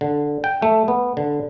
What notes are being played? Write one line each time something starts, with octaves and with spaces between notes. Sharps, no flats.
D3
G5
A3
B3
D3